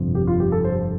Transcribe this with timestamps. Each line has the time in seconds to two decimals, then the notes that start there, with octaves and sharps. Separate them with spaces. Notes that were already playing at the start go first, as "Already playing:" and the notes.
Already playing: G1 F2 C3 F3 C4
0.15 G4
0.27 F4
0.40 G4
0.52 A4
0.64 C5